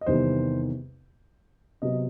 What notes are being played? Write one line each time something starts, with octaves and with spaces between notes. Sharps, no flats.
D#5
E2 C3 D#3 G3 B3 C5
C3 F#3 B3 D#5